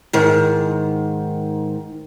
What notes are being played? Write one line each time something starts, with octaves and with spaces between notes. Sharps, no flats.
G#2 D#3